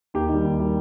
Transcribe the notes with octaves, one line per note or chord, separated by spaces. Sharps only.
D#2 G4
D#3 G3
D#2
D#3 G3